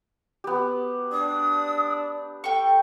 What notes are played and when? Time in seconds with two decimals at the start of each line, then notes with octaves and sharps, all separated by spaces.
0.44 B3 G4
1.12 D4 D#6
2.44 A4 G5 C#6